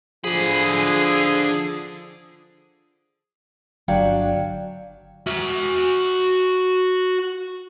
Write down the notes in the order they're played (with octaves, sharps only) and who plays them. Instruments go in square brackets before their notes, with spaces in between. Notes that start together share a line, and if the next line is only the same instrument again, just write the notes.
[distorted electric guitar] D3 B5 [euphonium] F3 [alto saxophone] G#4
[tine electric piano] G1 F5 G5 [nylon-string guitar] F#3 D4
[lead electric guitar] F#4 E5